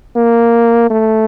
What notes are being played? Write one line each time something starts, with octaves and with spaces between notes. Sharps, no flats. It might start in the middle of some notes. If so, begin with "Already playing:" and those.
A#3
A3